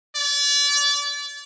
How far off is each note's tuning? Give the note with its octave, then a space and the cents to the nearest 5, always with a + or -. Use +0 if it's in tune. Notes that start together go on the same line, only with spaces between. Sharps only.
D5 -35